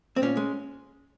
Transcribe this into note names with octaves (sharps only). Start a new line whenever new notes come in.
C4
A#2 C#4
G#3